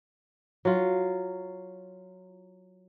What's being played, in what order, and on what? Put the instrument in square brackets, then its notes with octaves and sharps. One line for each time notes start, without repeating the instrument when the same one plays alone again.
[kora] F#3 F4